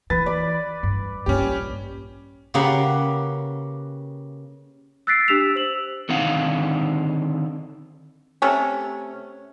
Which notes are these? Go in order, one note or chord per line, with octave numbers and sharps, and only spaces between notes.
E3 B4 A6
D5 B5
G2
A#1 G2 C#4 G4
C#3 A#3 G4 B4 F#5
E6 F#6 A6 B6 C7 D7
D4 G4 E6 B6 E7 F7
C5 E6 F#7
D3 D#3 C4 D#4 F5 F#5
C3 A3 C#4